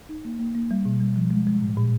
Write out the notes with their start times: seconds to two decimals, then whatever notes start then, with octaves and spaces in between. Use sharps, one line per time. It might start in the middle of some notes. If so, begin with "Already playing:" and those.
0.09 D#4
0.25 A#3
0.39 A#3
0.55 A#3
0.71 G3
0.85 B2
1.00 G3
1.16 F3
1.31 G#3
1.47 G#3
1.61 A2
1.77 A#2